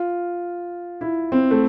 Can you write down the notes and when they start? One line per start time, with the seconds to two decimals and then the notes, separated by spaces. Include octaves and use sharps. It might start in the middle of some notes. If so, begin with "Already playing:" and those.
Already playing: F4
1.01 E4
1.32 C4
1.51 A3